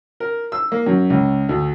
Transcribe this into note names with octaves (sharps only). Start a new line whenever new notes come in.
A#4
E6
A#3
F#2
C#2
D2